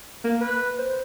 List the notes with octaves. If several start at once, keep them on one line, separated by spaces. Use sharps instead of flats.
A#3
B4
C5